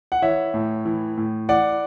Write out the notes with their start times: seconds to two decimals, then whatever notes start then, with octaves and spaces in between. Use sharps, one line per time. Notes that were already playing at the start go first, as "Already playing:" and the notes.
0.12 F#5
0.22 E3 C#5 E5
0.54 A2
0.85 E3
1.17 A2
1.49 E3 D5 F#5